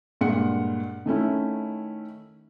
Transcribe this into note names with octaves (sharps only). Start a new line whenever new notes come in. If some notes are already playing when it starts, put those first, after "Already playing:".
G2 A#2 G#3 F#5 C#7
D#3 A3 C#4 E4